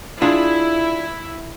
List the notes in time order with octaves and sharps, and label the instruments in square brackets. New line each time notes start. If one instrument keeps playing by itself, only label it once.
[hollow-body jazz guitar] D4 F4 G#4 [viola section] E4